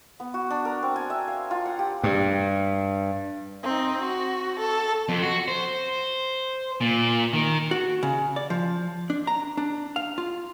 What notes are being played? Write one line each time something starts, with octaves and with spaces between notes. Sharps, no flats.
B3
F#4
D4
A#4
C4
G#5
E5
F5
F4
F#5
G4
G2
C4 D#4
F#4
A4
F2
F#4
C5
A#2
D#3
F#4
C#3
D5
F3
D4
A#5
D4
F5
F4